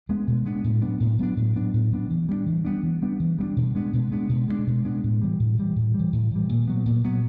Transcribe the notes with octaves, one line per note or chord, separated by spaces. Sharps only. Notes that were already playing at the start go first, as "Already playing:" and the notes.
G#3 B3 D4
B2
G#3 B3 D4
A2
F#3 B3 D4
A2
F#3 B3 D4
A2
F#3 B3 D4
A2
F#3 B3 D4
E3
G3 B3 D4
E3
G3 B3 D4
E3
G3 B3 D4
E3
G3 B3 D4
B2
G#3 B3 D4
B2
G#3 B3 D4
B2
G#3 B3 D4
B2
G#3 B3 D4
A2
E3 G3
A2
E3 G3
A2
E3 G3
A2
E3 G3
A#2
F#3 B3
A#2
F#3 B3